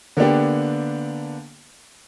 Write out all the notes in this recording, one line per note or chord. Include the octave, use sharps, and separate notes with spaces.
D3 A#3 B3 D4 G4